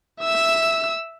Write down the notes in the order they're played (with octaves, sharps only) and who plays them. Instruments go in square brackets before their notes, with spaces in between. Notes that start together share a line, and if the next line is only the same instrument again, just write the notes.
[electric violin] E5 E6